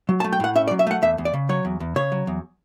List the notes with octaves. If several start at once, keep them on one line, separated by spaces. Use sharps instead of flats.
F#3
A5
A3
G5
A2 F#5
C#4 E5
D5
F#3
E5
A3 F#5
E2 E5
E2
D5
C#3
F#3 C#5
E2
E2
C#3 C#5
F#3
E2